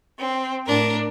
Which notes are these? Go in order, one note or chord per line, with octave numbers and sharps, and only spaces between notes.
C4
A2 D4 A#4